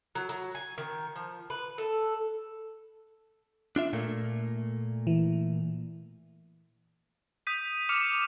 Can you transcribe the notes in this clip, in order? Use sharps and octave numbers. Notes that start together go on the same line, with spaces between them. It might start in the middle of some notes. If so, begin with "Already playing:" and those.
F#3
F#3
G#5
D#3
F3
B4
A4
D4 F4 E5
A#2 A3 A#3
E3
D#6 G6 B6 D#7
D6 F6 C#7 E7 F7